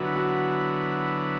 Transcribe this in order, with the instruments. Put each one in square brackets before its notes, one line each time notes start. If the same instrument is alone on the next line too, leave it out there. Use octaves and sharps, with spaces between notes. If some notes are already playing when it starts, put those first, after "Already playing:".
Already playing: [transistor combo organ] D3 F#3 B3 E4 [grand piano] F#4
[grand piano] F#4